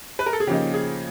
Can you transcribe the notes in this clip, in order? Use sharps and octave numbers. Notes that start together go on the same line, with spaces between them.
B4
A#4
A4
G#4
C#3 F3 A#3 D#4 G4
G#4